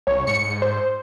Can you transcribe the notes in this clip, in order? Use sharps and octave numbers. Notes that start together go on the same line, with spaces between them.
C2 C#5
G#2 C#7
C5